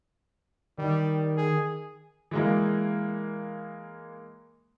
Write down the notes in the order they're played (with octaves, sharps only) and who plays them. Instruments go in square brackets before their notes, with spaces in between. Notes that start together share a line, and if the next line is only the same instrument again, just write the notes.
[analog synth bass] D#3 [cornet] G3
[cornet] G#4
[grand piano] E3 G#3 A#3